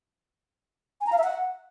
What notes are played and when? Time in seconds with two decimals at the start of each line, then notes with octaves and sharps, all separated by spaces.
1.01 G#5
1.07 A#5
1.12 F5
1.18 E5
1.24 F#5